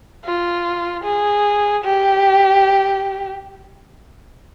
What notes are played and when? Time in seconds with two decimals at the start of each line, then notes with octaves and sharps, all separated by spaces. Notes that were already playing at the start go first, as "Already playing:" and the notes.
0.25 F4
1.04 G#4
1.84 G4